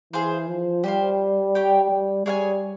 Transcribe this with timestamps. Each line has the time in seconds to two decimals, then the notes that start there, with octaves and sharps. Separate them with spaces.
0.13 E3 G#4 C5 F5
0.48 F3
0.84 G3 G4 C5 F5
1.55 G4 C#5 G5
1.91 G3
2.26 G3 G#4 C#5 F5 G#5